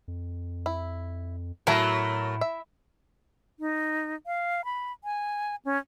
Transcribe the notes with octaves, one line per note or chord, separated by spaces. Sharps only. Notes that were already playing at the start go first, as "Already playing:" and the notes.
F2
E4
A2 F#3 A3 E4 A#4 G#5 A5
E5
D#4
F5
B5
G#5
C#4